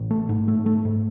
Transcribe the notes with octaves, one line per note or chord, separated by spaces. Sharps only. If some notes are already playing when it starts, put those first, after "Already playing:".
Already playing: A1
A3
G#2
A3
A3
G#2